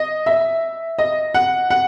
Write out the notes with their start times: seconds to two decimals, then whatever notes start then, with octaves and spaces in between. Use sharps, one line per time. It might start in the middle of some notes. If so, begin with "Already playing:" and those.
Already playing: D#5
0.26 E5
0.98 D#5
1.34 F#5
1.70 F#5